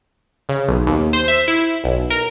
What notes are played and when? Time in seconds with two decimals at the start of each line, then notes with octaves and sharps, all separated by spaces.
0.49 C#3
0.68 B1
0.87 D#2
1.13 C5
1.28 E5
1.48 E4
1.84 B1
2.10 A#4